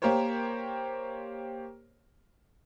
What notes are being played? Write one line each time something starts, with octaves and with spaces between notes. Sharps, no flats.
A#3 G4 A#4 C5 C#5